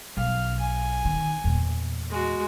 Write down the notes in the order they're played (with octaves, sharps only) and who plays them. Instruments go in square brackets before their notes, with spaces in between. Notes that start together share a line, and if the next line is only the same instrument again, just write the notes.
[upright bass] B1 [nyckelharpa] F5
[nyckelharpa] G#5
[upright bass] D#3
E2 A#2
[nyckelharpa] G#3 F#4